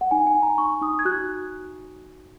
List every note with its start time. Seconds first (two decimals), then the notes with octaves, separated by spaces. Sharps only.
0.01 F#5
0.11 D#4 G#5
0.27 G#5
0.34 D#4
0.43 A#5
0.58 D#4 C#6
0.81 D#4 D#6
0.99 G#6
1.05 F#4 F#6